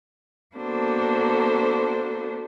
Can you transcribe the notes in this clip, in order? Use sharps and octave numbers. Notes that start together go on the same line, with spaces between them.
A#3 B3 D4 F#4 A4 C5